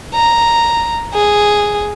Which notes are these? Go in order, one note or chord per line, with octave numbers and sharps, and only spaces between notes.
A#5
G#4